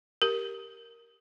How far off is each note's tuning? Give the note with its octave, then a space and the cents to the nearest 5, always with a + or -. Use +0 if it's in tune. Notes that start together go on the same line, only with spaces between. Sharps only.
G4 +0 A#4 +0